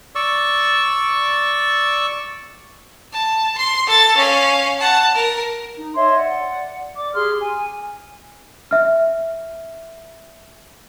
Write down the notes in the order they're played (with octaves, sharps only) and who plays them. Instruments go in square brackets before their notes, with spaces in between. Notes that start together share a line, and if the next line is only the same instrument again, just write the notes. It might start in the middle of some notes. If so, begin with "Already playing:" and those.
[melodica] D5 C#6 E6
[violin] A5
C6
A4 A6
C#4 F5
F#5 A5
A#4
[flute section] D#4
C#5 D#5 E5 C6
D5 F#5
D5 D6
G4 G#4 C6 F6
G#5
[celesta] E5 F6